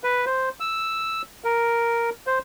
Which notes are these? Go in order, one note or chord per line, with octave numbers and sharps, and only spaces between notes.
B4
C5
E6
A#4
C5